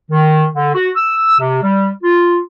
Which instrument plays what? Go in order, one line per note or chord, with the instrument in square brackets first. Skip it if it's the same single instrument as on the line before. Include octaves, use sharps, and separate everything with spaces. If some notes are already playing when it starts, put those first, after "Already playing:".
[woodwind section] D#3
D3
F#4
E6
C3
G3
F4